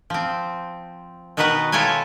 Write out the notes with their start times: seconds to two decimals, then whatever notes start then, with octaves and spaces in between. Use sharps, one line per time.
0.10 F3 C4
1.37 B2 D#3 F#4 B4 D#5 F#5
1.72 E4 F4 A4 C#5 G5 G#5